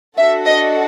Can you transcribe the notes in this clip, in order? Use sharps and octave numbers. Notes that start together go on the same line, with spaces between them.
D4 F#4 A4 E5
D#5